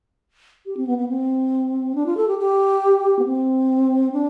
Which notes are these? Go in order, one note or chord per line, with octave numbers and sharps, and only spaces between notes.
G4
C4
B3
B3
C4
D4
F4
A4
G4
G4
B3
C4
D4